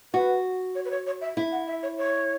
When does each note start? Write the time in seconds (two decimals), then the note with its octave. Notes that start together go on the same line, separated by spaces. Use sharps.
0.14 F#4 B4
0.75 C#5
0.85 B4
0.91 C#5
1.07 C#5
1.21 E5
1.37 E4 E5
1.51 F#5
1.67 E5
1.83 C#5
1.98 C#5